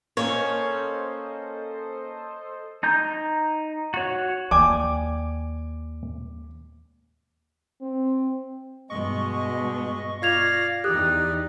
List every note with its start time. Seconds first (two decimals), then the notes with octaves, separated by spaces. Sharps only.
0.17 A#3 C#4 A4 C5 C#5 D#5
2.83 D#4 A#5 G6
3.94 F#4 C#5
4.51 D#2 D5 G5 G#5 D6
7.82 C4
8.90 G2 B2 G#3 D#5 C#6
10.22 F4 D5 F5 G#6 A#6 F7
10.84 E2 D#4 G4 D5 D#6 F#6